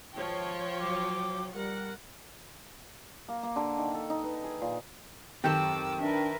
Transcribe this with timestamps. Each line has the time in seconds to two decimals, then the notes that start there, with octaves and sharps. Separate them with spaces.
0.14 G#1 B2 F3 C#5 G5 A5
0.81 F#3 D6
1.54 G3 A#4 F#5
3.29 A#3
3.43 A#3
3.56 D3
3.78 D#3
3.94 A4
4.10 D#4
4.23 B4
4.44 G#4
4.62 A#2
5.44 F#2 D#3 C4 G4 A4 D6 E6
6.01 D4 A#4 B4 E5